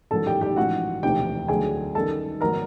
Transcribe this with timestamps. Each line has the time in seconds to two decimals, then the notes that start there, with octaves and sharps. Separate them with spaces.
0.11 A1 G#2 D#3 F#3 A4 A5
0.26 G4 G5
0.41 G4 G5
0.56 A1 G#2 F3 F#4 F#5
1.03 E1 D2 C3 F3 G4 G5
1.48 D2 D3 F#3 G#4 G#5
1.95 F#2 D#3 G3 A4 A5
2.41 G#1 D#3 F#3 B3 A#4 A#5